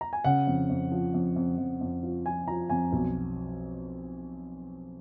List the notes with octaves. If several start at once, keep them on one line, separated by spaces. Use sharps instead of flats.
A#5
G#5
C#3 F#5
F2
F2
F3
F2
F2
F2
F2
F3
F3 G#5
F3 A#5
F2 G#5
B1